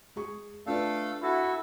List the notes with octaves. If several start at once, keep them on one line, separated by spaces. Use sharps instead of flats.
G#3 G#4 C#6
A3 D4 F4 A4 B4 F5
E4 F#4 A4